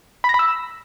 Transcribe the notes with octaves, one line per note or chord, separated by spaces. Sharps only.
B5
A#6
B5
E6